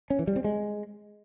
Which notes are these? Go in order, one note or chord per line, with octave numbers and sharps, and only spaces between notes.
C#4
E3
G3
C4
G#3